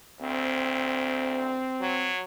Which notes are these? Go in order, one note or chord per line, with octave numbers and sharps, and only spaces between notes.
D2 C4
F#3